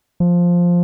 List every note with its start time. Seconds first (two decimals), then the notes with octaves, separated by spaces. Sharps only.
0.20 F3